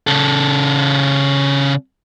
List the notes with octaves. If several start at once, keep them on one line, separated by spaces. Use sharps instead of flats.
C#3 A4